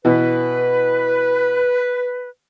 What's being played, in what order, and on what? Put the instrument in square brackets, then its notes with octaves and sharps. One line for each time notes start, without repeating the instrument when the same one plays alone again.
[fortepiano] B2 E3 [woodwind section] B4